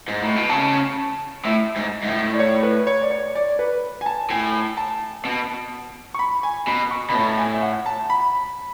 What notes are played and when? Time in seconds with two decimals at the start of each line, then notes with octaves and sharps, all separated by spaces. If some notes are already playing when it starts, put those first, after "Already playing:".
0.08 G#2
0.22 A2
0.36 B2
0.49 C#3 A5
1.45 A2 E5
1.77 G#2
2.04 G#2
2.08 A2
2.33 D5
2.39 C#5
2.63 B4
2.87 C#5
3.01 D5
3.10 C#5
3.35 D5
3.59 B4
4.01 G#5
4.06 A5
4.30 A2 G#5
4.77 A5
5.25 B2
6.14 C#6
6.19 B5
6.43 G#5
6.67 B2 B5
6.91 C#6
7.09 B2 B5
7.14 A2 A5
7.38 G#5
7.54 E5
7.62 F#5
7.86 A5
8.10 B5